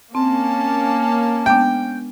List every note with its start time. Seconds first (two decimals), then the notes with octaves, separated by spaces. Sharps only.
0.15 A#3 C4 C#4 A5
1.46 G#3 B3 D4 G5